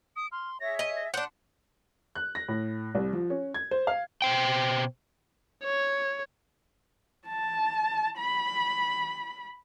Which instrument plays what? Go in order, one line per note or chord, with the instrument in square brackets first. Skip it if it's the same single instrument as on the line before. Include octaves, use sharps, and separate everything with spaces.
[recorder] D#6 [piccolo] D7
[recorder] C6 [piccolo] F6
[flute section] G#4 E5 [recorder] C#5 [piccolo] A#6
[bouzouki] D#5 [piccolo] D#7
[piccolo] A#6
[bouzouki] D4 F#5 [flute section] C6 [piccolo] F#6 [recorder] G6
[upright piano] F#6
A#6
A2
C2
F3
C#4
G#6
C5
F5
[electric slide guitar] B2 C5 G5
[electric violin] C#5
[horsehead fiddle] A5
B5